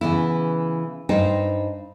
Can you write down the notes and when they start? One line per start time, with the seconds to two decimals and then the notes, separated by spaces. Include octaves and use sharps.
0.01 C#3 E3 B3 E4
1.09 G2 D#4 C5 G5